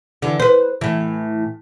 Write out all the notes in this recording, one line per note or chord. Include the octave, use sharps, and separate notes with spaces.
D3 E3
B4 C5
A2 E3